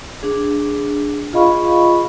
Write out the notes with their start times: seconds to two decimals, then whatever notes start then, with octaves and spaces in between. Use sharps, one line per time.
0.23 D4 G#4
1.33 F4 G#4 D#5 F5 B5 C#6